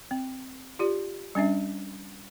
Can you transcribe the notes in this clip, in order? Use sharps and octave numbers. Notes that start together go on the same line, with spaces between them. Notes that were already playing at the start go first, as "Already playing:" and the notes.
C4
F4 G4 D5
G3 C#4 D4 E5